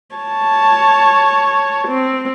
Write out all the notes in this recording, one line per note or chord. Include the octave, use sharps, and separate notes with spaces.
C#5 A5
C4